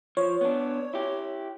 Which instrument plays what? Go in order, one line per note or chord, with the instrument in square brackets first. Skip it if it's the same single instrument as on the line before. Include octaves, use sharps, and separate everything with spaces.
[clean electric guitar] F3 [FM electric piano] C#5
[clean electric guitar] B3 D4
E4 G4